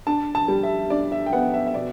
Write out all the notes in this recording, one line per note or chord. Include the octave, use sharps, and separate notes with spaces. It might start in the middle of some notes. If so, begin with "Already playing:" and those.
D4 A5
A5
G3
E5
D4 D5
E5
G5
B3 F#5
E5
E5
B2 D5